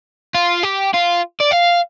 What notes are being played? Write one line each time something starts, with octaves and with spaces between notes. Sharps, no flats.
F4
G4
F4
D5
F5